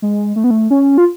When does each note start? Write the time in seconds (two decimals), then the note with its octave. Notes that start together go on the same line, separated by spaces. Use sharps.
0.02 G#3
0.36 A3
0.44 B3
0.51 A3
0.70 C#4
0.98 F4